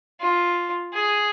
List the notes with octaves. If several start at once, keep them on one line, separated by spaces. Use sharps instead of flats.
F4
G#4